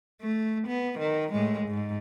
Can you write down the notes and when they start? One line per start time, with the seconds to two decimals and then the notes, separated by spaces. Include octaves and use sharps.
0.21 A3
0.67 B3
0.99 D#3
1.32 A2 G#3
1.68 G#2